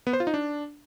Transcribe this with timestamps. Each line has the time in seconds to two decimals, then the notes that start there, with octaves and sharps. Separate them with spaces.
0.07 B3
0.13 C5
0.20 F4
0.27 D#4
0.34 D4